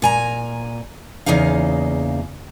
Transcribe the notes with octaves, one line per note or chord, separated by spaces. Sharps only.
A#2 G#5 A#5
E2 C#3 A#3 D#4 F5